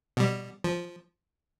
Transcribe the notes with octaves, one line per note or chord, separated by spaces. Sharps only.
B2 G3
F3